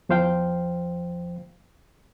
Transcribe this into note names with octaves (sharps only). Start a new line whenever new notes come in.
E2 F3 C5 F5 G5